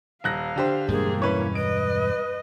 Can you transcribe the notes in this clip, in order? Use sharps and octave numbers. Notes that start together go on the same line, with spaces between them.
D#1 F5 F#6 A#6
D3 G4 C5
E1 G2 G3 G#3 A#3 G#4
C#4 E4 B4 C#5
B4 D#5 D7